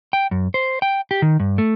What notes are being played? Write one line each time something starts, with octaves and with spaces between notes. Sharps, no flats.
G5
F#2
C5
G5
G4
D#3
G2
A3